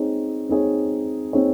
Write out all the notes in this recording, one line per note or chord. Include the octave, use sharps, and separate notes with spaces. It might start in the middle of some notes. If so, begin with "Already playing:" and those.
Already playing: C4 D#4 G#4 C#5
C4 D#4 G#4 C#5
C4 D#4 G#4 C#5